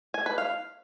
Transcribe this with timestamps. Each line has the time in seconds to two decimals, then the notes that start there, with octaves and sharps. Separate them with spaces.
0.14 G#5
0.26 B4
0.38 F5